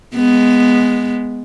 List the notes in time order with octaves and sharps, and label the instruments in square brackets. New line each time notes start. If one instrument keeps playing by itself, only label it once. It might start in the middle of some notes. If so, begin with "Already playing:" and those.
[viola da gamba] G#3 B3